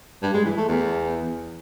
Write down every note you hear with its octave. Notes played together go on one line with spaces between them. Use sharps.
G2
G#3
E3
A3
E2